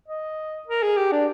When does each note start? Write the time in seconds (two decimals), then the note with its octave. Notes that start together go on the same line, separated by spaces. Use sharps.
0.08 D#5
0.68 A#4
0.83 G#4
0.97 G4
1.12 D4